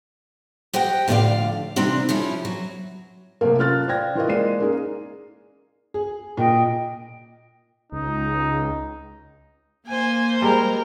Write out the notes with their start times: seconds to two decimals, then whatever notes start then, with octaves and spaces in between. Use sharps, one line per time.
0.73 G4 C5 D#5 F#5 G5
1.08 A2 D3 F3 B3 D5 F5
1.76 C3 E3 G3 C4 D4 D#4
2.09 F3 G3 C#4 E4
2.45 F#3
3.41 C3 F#3 A3 A#3
3.58 C#4 F4 A4 F6 F#6 A6
3.88 C5 D5 F5 G5 G#6 A#6
4.15 E3 F4 F#4 A#4 C5 D#5
4.29 G#3 A#3 D5 C7 D#7
4.60 A#3 C#4 D#4 G#4
5.94 G#4
6.37 A#2 D#5 G5
7.92 C#2 D#4
9.87 A#3 C5 G#5
10.42 G3 G#3 A#4